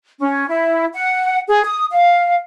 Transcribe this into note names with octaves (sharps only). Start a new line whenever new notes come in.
C#4
E4
F#5
G#4
D#6
F5